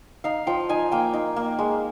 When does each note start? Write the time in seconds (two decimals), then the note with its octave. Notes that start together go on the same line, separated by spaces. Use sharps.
0.24 D#4 F5
0.47 F3 G5
0.69 D#4 G#5
0.92 A#3 G5
1.14 D#4
1.36 A#3
1.59 G#3